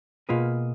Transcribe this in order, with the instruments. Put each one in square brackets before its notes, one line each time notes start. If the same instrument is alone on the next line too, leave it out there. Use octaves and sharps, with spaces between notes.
[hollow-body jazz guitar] B2 A#3 F4 G#4 B4